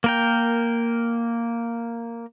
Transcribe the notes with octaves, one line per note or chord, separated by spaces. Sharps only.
A#3 A#4 G5